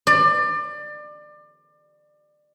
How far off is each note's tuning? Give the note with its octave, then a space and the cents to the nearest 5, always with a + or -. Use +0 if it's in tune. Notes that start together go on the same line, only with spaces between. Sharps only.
D5 +25